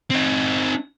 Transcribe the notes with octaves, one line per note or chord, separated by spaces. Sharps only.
C4 D#4